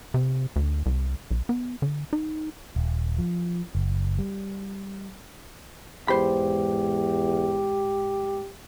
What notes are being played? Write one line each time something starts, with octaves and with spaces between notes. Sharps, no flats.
C3
D2
C2
B1
B3
D3
D#4
D#1
F3
F#1
G3
E2 G#2 G4 C5 B5